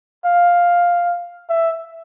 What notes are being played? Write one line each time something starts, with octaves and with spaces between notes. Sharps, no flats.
F5
E5